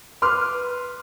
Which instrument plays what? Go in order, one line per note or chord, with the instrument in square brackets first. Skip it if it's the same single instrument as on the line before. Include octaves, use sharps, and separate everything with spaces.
[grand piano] B4 C6 D6 F6